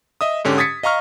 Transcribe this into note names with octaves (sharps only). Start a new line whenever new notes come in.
D#5 E5 D#6
G#2 D3 C#4 G4
D#6 G#6 A6 B6 C#7
D#5 F5 A#5 C#6 F6